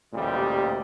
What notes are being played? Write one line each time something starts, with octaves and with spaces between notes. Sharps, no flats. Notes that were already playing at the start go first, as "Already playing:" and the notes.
A1 D2 A#2 G3 G#3 G4